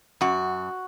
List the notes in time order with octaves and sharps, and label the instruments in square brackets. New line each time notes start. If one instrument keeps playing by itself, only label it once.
[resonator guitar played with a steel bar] F#2 F#4